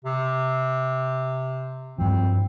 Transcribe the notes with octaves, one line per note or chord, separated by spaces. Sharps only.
C3
G2 F3 C4